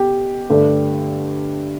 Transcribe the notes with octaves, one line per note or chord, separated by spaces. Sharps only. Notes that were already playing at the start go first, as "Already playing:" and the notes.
Already playing: B2 G4
G2 D3 A3 D4